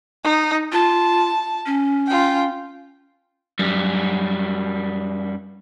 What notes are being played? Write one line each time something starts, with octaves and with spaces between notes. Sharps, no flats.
D#4
F4 A5
C#4
F4 G5
F#2 G3